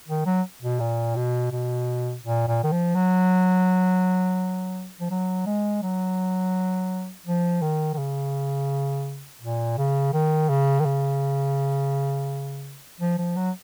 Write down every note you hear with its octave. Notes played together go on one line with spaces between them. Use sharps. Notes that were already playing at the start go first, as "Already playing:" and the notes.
D#3
F#3
B2
A#2
B2
B2
A#2
A#2
D#3
F3
F#3
F3
F#3
G#3
F#3
F3
D#3
D#3
C#3
A#2
C#3
D#3
C#3
D#3
C#3
F3
F3
F#3